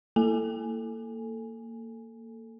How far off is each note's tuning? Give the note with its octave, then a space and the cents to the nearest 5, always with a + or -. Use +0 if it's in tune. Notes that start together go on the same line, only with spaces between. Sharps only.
A#3 -20 A4 +0 G#5 +0